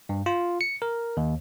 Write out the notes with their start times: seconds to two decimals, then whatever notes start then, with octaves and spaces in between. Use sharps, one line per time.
0.09 G2
0.26 F4
0.61 C#7
0.82 A#4
1.17 D#2